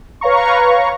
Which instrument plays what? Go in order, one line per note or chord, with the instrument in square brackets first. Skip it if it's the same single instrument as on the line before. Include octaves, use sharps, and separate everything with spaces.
[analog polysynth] B4 C#5 F5 A#5 C#6